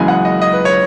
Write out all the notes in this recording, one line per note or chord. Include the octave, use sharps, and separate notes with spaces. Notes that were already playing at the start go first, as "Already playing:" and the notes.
Already playing: F#1 F#2 C#3 E3 G#3 G#5
F#5
D#5
D#5
B4
C#5